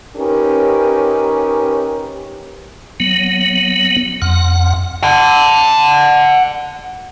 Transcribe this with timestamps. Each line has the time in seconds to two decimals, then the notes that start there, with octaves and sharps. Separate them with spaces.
0.17 C#4 D#4 G4 A#4 B4
3.00 F#3 B3
4.22 F2 F#5
5.03 F#5 A5